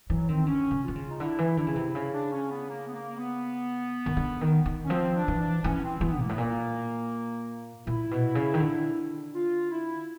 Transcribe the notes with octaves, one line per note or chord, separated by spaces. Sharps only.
E3 F#3
D#3 C4
D3 C#4
C#3
D3 F4
C#3
D#4
D3 E4
E3
D3 E4
C#3
C3
C#3 E4
D4
C#4
B3
A#3
B3
A#3
B3
D#3
D3
D#3
D#3
C#4
F3 C4
D4
E3
D4
E3 C#4
B3
C4
E3 B3
G#2 A#3
A2 B3
A#2 A#3
A#2 E4
B2
C#3
D#3
D3
F4
E4